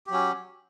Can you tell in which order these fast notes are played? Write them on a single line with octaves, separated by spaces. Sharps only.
G4 F#3 C#4